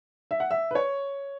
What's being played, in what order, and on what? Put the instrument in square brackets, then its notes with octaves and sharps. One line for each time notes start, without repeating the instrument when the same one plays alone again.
[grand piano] E5
F#5
E5
B4
C#5